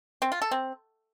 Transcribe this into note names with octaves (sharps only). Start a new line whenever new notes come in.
C4
F4
A4
C4